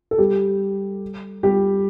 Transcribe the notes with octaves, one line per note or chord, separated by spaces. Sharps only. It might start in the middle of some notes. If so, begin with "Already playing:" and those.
A4
G3 G4
G3 G4